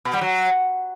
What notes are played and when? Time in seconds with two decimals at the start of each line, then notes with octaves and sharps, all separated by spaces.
0.05 B2
0.13 G3
0.21 F#3